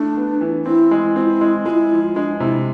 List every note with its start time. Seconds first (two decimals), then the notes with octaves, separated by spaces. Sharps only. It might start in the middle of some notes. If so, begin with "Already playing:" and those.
Already playing: A3 D4 E4
0.16 B3
0.41 E3
0.66 C4 E4
0.91 G#3
1.16 C4 F4
1.21 E4
1.41 G#3
1.65 G#3 E4 F4
1.91 F3
2.16 G#3 D4
2.40 C3 E4